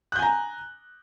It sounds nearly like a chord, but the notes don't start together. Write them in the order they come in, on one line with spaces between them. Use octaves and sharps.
F#6 G6 G#5 A#5